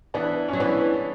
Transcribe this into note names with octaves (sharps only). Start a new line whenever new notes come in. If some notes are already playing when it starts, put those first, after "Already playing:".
E3 B3 D4
F#3 C#4
E3 B3 D4